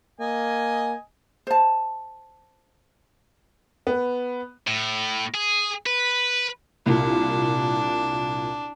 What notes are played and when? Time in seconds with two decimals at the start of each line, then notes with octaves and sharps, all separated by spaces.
0.20 A#3 D#5 G#5
1.47 C5 A5
3.87 B3
4.67 A2
5.34 G#4
5.86 B4
6.86 C2 A#2 D4